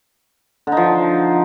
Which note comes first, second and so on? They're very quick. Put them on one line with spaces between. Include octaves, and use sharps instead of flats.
D3 D#4 F3